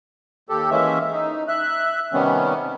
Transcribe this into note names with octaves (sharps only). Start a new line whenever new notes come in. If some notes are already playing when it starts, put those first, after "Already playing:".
D#2 G4 A4
E3 G#3 A#3 C#4 E5
D#4
E5 F#6
C3 D#3 G3 B3 C#4